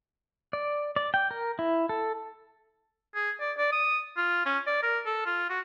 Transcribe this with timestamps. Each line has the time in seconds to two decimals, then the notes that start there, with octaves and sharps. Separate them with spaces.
0.53 D5
0.96 D5
1.14 G5
1.31 A#4
1.59 E4
1.89 A4
3.15 G#4
3.40 D5
3.57 D5
3.72 D#6
4.17 F4
4.46 C#4
4.67 D5
4.83 A#4
5.06 A4
5.26 F4
5.50 F#4